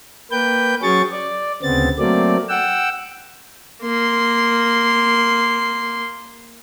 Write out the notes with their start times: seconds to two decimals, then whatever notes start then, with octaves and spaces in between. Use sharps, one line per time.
0.31 A#3 B4 G5 G6
0.82 F#3 C#4 G#4 C#5 C#6 A6
1.12 D5
1.63 D2 C#3 B3 C4 A6
1.99 F#3 A3 A#3 C4 D5
2.49 F#5 G5 E6
3.82 A#3 C6